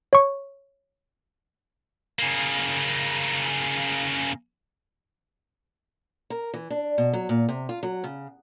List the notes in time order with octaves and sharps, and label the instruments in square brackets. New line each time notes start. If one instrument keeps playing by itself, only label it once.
[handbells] C#5 C#6
[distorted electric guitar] C#3 A#3
[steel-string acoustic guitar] A#4
E3
D4
B2
F#3
A#2
C3
F4
F#3
C#3